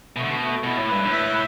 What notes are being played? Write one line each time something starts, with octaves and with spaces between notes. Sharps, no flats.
B2 A3
D3
B2
A3
B2 E4
A2
G2 B4
A2
E5